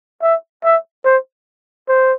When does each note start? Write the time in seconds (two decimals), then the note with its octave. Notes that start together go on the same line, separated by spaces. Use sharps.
0.22 E5
0.64 E5
1.05 C5
1.88 C5